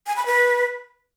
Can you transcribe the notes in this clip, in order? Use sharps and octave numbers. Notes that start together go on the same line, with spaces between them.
G#5
B5
B4